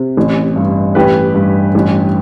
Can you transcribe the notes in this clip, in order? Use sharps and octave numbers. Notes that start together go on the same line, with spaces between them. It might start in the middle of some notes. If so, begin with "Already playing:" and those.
Already playing: C3
A1
G2
A1 G4 B4
G2
A1